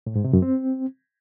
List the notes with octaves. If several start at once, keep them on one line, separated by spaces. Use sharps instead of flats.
A2
G#2
C3
F#2
C4